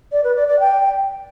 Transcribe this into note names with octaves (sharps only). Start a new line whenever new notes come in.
D5
B4
D5
D5
G5